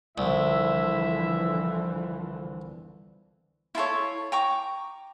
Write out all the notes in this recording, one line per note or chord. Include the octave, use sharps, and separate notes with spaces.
C2 D3 E3 F3 E4 E5
E4 F4 A4 C#5
G5 A#5 C#6 D6